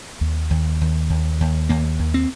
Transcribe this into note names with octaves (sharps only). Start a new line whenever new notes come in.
D#2
D#2
D#2
D#2
D#2
D#2 A#3
D#2
C4